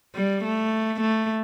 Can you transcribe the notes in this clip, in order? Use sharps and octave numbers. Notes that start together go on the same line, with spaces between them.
G3
A3
A3